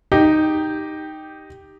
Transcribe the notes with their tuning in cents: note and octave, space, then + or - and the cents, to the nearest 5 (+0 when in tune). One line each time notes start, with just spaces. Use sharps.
D#4 -5 G4 +0